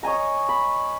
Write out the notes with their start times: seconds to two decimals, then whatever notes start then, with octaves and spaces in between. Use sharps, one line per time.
0.03 C#5 D#5 G#5 A#5
0.49 B5